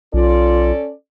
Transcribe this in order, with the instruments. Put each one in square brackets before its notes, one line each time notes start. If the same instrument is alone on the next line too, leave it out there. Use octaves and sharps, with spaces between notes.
[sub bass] B1 [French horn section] C#4 A4 D5 [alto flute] F4